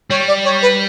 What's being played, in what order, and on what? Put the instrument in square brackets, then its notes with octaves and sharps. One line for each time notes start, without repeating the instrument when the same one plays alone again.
[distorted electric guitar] G3 [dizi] C#5
[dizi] D5
C#5
B4